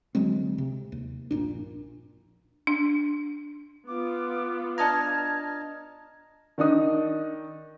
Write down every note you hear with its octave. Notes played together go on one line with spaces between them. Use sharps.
D2 F#3 G#3 C4
C3
D#2
A#1 G2 A#2 D4
D4
B3 F4 D6
D4 D#5 A5 A#5 F6 G#6
D#3 D4 D#4 D#6